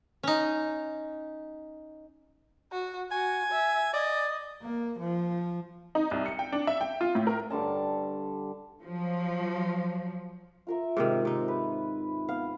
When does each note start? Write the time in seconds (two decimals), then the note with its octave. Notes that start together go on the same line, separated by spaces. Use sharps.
0.23 C#4 D#4
2.72 F#4
3.11 F#4 G#5
3.52 E5
3.94 D5 D#5
4.62 A#3
4.99 F3
5.95 D#4
6.11 C2
6.26 C#7
6.39 G5
6.52 D4
6.67 E5
6.81 G5
7.01 F4
7.15 A2
7.27 A#4
7.50 G2 D3 A5
8.82 F3 F#3
10.67 F4 A#4 E5
10.97 G#2 C3 D#3
11.25 C3 D#4
11.48 B4
12.29 B3 F5